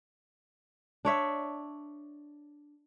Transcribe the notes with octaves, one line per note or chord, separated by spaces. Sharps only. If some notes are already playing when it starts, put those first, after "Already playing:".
D4 C#5 E5